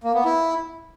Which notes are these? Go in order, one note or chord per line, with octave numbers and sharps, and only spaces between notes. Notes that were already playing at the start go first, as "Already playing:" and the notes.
A#3
B3
E4